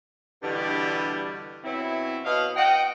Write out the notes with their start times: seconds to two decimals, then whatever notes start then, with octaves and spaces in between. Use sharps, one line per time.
0.43 G2 B2 D3 E3 G3
1.64 B2 F#3 C4 E4
2.25 B2 D#5 F5
2.56 D#5 F#5 G5